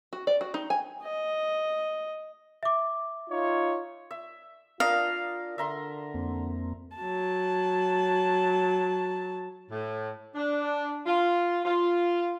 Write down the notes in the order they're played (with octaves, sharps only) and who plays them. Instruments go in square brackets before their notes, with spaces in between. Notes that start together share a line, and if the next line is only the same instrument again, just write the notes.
[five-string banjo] F#4
D5
F#4
D#4
G#5
[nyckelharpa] D#5
[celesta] E5 D6
[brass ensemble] D#4 F4 C#5
[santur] E5
[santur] D4 A#4 D#5 [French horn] F4 [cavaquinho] F5
[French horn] D3 [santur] E5 A#5 C6
[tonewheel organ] F2 A#3 C4
[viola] F#3 A5
[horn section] A2
D4
F4
F4